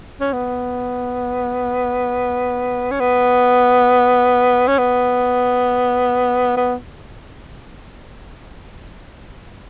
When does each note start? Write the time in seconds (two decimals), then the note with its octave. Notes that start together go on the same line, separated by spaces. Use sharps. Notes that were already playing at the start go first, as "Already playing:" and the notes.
0.21 C#4
0.33 B3
2.91 C#4
3.00 B3
4.68 C#4
4.78 B3
6.57 B3